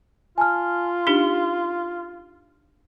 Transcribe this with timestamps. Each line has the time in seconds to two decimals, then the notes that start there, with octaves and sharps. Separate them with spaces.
0.38 F4 G#5 A5 F6
1.07 D4 D#4 G4 G7